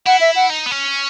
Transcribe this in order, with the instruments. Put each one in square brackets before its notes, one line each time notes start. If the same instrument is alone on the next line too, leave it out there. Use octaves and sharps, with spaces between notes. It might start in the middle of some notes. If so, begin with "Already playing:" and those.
[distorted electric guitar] E4 [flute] F#5
[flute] E5
F#5
[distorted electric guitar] D#4
B3
C#4